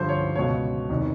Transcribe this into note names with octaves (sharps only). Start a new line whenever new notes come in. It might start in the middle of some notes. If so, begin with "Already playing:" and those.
Already playing: G2 D3 F3 C5
C#5
C#2 B2 C#5
E2 C3 D#3